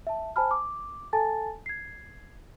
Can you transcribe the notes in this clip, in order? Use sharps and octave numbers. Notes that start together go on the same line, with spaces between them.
E5 A5
C5 G#5 A5 B5 F6
D6
A4 G#5 A5 A6
G#6 C7